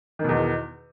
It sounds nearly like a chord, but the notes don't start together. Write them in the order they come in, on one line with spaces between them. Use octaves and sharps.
D#3 B2 E2